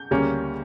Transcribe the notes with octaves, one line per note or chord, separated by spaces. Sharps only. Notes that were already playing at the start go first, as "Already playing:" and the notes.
Already playing: G6
D2 C#3 G3 A#3 C#4